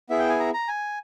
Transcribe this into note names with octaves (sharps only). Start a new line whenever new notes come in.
B3 E4 G#4 E5
G5
G#5
A#5
A#5
G#5